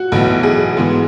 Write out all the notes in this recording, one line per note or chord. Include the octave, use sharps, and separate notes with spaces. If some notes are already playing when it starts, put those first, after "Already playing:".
Already playing: F#4
B1 A2 E3 B3
G#4
G#2 E3 B3